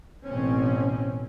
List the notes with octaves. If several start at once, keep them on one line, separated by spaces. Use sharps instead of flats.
A1 B2 C4 C#4